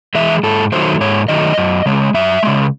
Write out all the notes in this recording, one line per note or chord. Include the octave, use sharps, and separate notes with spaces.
E3 G#3 E5
G#2 A4
D#3 F#3 A3 C5
G#2 C#5
D#3 F#3 A3 D#5
F#2
C#3 G#3
F#2 E5
C#3 G#3